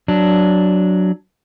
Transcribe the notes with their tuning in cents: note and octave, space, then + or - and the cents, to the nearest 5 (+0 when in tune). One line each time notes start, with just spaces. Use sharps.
F#3 +0 D4 +0